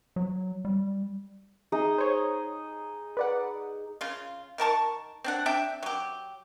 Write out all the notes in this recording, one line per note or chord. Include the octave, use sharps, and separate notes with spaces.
F#3
G3
D#4 G#4 D#5
C5 C#5
B4 D5 F#5
C#3 F4
D#3 A#4 A5 C#6
C4 D4 F#5
C4 D4 E5 G5
F#3 G4